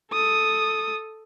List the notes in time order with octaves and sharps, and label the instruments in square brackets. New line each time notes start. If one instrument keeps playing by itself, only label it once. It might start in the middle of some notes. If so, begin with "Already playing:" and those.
[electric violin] A4 D#6